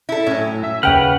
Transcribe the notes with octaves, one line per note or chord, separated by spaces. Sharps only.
E4 A4
A2 F#3 C#4
E5
D#2 C#3 B4 F#5 G5 F6